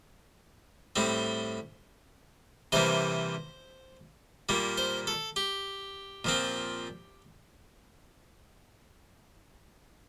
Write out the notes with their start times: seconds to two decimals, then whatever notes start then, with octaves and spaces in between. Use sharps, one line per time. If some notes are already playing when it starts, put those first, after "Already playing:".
0.96 A2 G3 C4
2.72 C3 E3 G3 A#3 C5
4.49 A#2 G3 A#3
4.78 C5
5.07 A4
5.36 G4
6.25 A#2 F3 C4